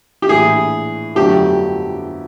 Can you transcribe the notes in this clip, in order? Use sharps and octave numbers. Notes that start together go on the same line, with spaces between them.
G4
A#1 A2 E3 G#4
G1 F2 D3 F#3 A3 G4